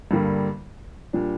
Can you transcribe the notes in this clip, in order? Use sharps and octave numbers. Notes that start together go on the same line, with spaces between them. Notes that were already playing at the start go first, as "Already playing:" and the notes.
G2 D3 G3 A#3
A#2 G3 D4